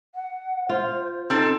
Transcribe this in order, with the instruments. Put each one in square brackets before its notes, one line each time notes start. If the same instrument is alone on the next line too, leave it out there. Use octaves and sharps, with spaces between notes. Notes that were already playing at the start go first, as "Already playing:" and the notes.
[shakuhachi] F#5
[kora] F4 [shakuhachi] C5
[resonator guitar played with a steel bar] C4 A4 [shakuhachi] D#4